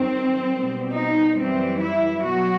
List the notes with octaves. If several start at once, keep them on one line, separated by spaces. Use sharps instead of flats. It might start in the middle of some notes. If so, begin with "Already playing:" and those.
Already playing: G2 D#3 F#3 C4
B2 G3
D#4
F#2 E3 G3 C4
E4
B2 F#3 F#4